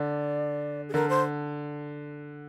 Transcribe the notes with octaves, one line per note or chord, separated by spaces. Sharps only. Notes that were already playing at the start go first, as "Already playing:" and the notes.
Already playing: D3 D5
G#4
D3 A#4
C5